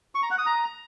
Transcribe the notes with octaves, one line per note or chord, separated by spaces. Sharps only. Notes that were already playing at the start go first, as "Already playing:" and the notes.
C#6
A#5
F#5
D#6
A#5